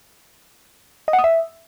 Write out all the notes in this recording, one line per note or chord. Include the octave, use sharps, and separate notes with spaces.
D#5
F#5
D#6
E5